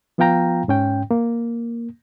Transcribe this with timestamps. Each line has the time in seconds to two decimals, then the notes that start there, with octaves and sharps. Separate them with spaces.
0.18 F3 B3 F4 F5 G5 A#5
0.68 G#2 C#4 G5
1.11 A#3